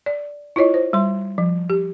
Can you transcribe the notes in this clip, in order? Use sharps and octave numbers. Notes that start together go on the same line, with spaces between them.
D5
E4 F4 C#5 D#5
C5
G3 C6
F3
G4